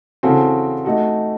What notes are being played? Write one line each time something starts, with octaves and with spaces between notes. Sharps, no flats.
C#3 E3 C4 F#4 A4
A3 D#4 F#4 A4